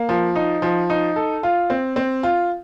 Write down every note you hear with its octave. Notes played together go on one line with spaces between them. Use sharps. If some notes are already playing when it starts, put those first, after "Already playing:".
Already playing: A#3
F3
D#4
F3
D#4
A4
F4
C4
C4
F4